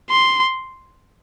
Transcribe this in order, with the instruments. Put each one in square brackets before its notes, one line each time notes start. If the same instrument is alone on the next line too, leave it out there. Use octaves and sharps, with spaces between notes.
[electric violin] C6